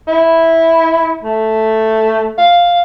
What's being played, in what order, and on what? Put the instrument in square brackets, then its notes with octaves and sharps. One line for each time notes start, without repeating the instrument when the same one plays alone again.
[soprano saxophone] E4
A3
F5